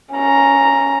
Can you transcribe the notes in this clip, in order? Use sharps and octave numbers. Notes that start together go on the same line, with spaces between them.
C#4 A#5